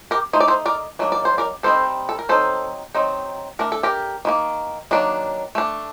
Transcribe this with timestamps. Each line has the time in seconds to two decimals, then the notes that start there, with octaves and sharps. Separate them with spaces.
0.11 G4 A#4
0.33 A3 D#4 C5
0.40 D5
0.48 A4 C5
0.66 A#4 D5
0.99 D#3 F#3 A#3 D4
1.12 D5
1.25 C5
1.38 A#4 D5
1.63 D#3 G3 C4 D#4 A4 C5
2.09 A4
2.19 A#4
2.29 F#3 C4 D#4 A4 C5
2.94 D#3 F#3 C4 D#4
3.59 A3 D4 A#4
3.72 A4
3.83 G4 A#4
4.25 D#3 G3 A#3
4.91 D#3 F#3 A#3 D4
5.55 A3 D4